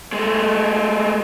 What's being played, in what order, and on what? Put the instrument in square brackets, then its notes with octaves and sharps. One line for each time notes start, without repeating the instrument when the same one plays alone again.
[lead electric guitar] G#3 A3